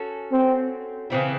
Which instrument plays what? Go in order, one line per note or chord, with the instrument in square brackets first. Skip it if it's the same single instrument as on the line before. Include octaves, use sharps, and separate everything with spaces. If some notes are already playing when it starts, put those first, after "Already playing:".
Already playing: [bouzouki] C#4 F#4 A4
[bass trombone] C4
[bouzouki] C#3 E3 C4 E4